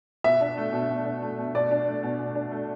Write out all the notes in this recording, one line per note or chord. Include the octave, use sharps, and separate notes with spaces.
B2 E5
D4
A3
B2
B2
D4
A3
B2
B2 D5
D4
A3
B2
B2
D4
A3